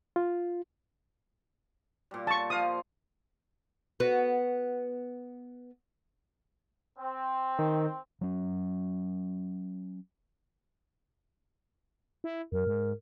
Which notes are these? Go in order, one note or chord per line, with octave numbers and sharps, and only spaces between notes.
F4
A#2 G3
A5 C#6
F3 F5 D#6
B3 F#4
C4
D#3
F#3 C#4
E4
F#2 A#4
G#2